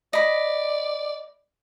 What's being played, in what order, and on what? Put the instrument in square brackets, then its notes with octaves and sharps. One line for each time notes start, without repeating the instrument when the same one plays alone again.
[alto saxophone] D5 [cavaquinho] D#5 B5